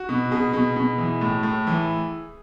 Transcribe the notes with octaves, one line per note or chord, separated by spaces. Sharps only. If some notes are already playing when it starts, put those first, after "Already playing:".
Already playing: F#4
B2
B2 G#4
B2
B2
E3
A2
A2
E3